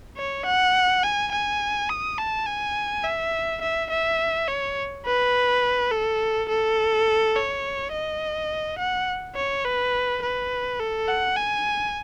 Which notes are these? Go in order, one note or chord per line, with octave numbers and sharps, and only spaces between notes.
C#5
F#5
G#5
G#5
D#6
A5
G#5
E5
E5
E5
C#5
B4
A4
A4
C#5
D#5
F#5
C#5
B4
B4
A4
F#5
G#5